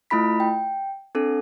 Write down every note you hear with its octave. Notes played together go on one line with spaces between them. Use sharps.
A3 E4 F4 B5 B6
G5
C4 D4 A4